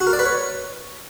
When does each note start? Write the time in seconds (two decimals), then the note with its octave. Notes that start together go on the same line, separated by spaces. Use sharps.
0.01 F#4
0.07 A#4
0.13 D5
0.19 B4
0.25 C#5